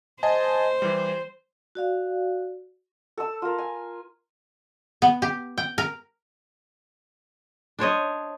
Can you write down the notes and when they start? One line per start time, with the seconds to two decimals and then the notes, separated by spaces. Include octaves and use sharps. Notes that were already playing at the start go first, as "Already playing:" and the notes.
0.23 C5 D#5 G#5 A5
0.82 E3 G3
1.75 F#4 D5 F5
3.17 A4 E6
3.42 F4 A#4
3.58 G#5
5.02 B3
5.22 G4
5.58 G5
5.78 A#4
7.79 D4 C5 C#5 D#5